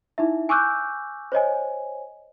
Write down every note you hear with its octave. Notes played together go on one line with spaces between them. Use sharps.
D#4 E4 E5
G#5 C#6 D6 E6 F#6 G6
C5 C#5 D#5 G#5